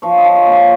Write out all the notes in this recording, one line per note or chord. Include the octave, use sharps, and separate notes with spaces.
F3 C#5
D#5
F3
C#5
A#3 C#5